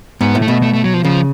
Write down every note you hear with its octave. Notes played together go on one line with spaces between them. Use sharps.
G#2 B3
A2
A3
B2
A3
A3
F#3
F3
C#3 F3